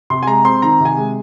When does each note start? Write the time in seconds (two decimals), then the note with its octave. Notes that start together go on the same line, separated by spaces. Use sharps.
0.10 C3 C6
0.23 G#5
0.27 G#3 A#5
0.45 C4 C6
0.62 D#3 A#5
0.80 C3
0.85 G#5
0.98 G#3